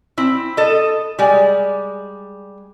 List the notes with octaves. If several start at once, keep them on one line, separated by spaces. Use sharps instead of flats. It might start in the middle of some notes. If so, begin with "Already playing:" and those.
C4 E4
A4 D#5
G3 G#3